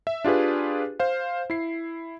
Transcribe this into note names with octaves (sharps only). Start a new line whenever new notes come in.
E5
D4 F4 G4 G#4 B4
C5 F5
E4 C7